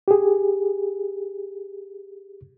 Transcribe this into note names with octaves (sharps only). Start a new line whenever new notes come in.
G4 G#4